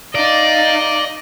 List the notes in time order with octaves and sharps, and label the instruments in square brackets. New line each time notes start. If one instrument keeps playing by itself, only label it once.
[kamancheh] D#4 F5 [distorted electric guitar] D5 [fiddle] D#5